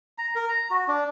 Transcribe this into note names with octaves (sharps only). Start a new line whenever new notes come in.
A#5
A#4
A#5
F#4
D4